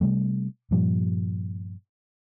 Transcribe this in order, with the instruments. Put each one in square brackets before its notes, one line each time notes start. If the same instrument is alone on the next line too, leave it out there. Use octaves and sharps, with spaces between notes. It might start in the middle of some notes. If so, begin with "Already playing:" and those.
[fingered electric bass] C3 G3 A3
G2 A#2 F3 G3